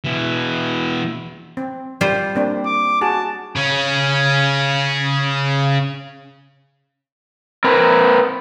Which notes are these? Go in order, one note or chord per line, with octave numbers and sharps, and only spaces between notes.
B2 E3
C4
G3 F4 C5
A#3 C4 D4
D6
F#4 G#4 A5
C#3 C#4
C4 A#4 B4